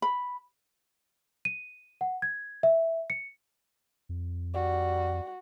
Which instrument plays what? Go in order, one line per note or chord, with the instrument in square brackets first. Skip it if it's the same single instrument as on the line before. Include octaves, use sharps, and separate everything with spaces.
[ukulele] B5
[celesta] D#7
F#5
G#6
E5
C#7
[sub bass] F2
[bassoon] G3 [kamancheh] F#4